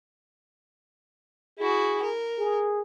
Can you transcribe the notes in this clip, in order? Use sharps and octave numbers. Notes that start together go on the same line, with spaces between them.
E4 F#4 G#4
A#4
G#4